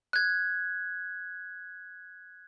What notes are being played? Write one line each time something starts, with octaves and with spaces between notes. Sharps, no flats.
F#6 G#6